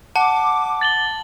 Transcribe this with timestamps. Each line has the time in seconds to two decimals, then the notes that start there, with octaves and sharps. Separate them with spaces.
0.16 F#5 A5 D6
0.81 A6 F#7 G7